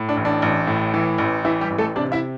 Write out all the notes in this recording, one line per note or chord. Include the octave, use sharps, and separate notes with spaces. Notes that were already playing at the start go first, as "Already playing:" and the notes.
Already playing: A2
D4
A1
D4
A1
A2
E3
A1
E3 E4
G3 G4
A1
A3 A4
C3 D4 D5
E4 E5